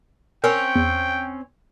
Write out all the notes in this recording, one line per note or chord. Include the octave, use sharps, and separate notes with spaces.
C4 C#4 A#4 C#5 G5
E2